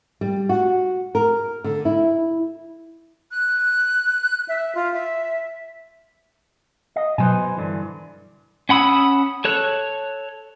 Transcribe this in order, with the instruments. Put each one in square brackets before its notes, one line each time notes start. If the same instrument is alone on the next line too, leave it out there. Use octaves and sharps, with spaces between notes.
[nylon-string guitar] G3
F#4
A#4
D3
E4
[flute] F#6
E5
F4
E5
[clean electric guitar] D#5
[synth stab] B2 F#3 [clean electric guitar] B4 C5 G#5
[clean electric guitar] G2 D3 E3
[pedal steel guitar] C#4 F#5 B5 D#6 E6
A4 C#5 F#6